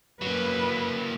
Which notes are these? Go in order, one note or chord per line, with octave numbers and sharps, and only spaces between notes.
F#2 F#3 A#3 B4